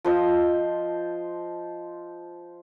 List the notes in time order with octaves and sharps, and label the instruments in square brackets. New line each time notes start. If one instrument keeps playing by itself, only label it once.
[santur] F3 C5 D#5